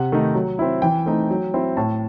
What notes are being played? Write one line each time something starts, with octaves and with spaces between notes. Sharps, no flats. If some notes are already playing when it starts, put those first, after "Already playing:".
Already playing: C3 F#5
D#3 A3 D#4
F#3
C4 E4
E3 G5
A3 C4 D#4
F#3
C4 E4
A2 A5